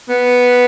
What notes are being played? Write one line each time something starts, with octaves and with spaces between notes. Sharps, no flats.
B3